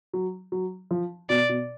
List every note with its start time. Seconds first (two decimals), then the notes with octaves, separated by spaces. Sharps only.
0.13 F#3
0.52 F#3
0.91 F3
1.29 B2 D5
1.49 B2